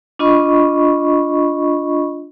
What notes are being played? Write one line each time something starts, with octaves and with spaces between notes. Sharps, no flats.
D4 F4 D#5 B5 C#6